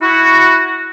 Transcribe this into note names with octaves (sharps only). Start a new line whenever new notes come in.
E4 F#4